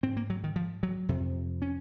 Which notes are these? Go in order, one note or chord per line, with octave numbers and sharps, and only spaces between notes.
G#2 C4
A#3
F#3
D#3
F3
F#3
F2 C3
C#4